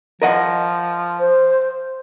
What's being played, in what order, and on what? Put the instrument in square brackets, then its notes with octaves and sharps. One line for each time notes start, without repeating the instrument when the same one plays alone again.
[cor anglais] F3 [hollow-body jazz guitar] A#4 D#5 F#5
[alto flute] C5